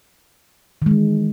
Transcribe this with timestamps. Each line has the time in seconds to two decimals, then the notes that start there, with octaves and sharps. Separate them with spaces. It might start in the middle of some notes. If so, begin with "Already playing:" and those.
0.82 D#3
0.86 G#3
0.91 E3